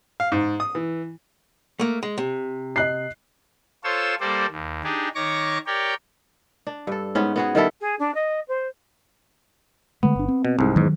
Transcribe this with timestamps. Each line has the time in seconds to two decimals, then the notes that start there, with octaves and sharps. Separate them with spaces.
0.20 F5
0.32 G#2
0.60 D#6
0.75 E3
1.80 A3 A#3
2.03 G#3
2.18 C3
2.76 D#5 F#6 C7
3.84 F4 A4 C5 C#5 E6
4.20 G3 A#3 A4 C5 D5
4.51 D#2
4.84 D4 D#4 G4 G#4
5.15 D#3 C#5 C#6 D6 A#6
5.67 G4 A#4 C#5 D5 G5
6.67 D4
6.87 G2 A4
7.15 G#2 B3 C#4
7.36 B3 F#4 G#4
7.55 D#3 G3 E4 A4
7.80 G#4
7.99 D4
8.14 D#5
8.48 C5
10.03 D3 G#3 A3 B3
10.16 G1 D4
10.28 C4
10.45 B2
10.59 C2 G#2
10.76 E2 G#2 D#3 F#3